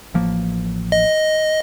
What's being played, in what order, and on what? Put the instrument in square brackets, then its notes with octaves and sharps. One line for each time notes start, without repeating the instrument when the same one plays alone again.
[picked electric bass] A1 F3 A#3
[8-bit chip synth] D#5